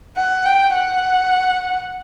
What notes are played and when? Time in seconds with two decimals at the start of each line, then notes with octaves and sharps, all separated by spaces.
0.17 F#5
0.45 G5
0.75 F#5